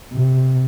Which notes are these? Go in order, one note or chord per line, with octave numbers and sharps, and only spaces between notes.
C3